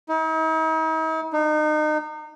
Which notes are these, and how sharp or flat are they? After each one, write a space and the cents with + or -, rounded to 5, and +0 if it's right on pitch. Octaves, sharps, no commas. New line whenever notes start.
D#4 +45
D#4 -30